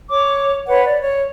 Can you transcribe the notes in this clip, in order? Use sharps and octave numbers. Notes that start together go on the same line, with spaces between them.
C#5 D6
B4 C#5 F#5
D5
C#5